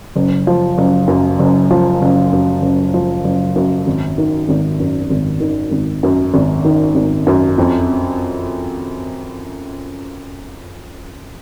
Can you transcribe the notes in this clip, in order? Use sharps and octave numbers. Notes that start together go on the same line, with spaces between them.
F#1
F3
F#1
F#2
F#1
F3
F#1
F#2
F#1
F3
F#1
F#2
G#1
D#3
G#1
F#2
G#1
D#3
G#1
F#2
G#1
D#3
G#1
F#2
F2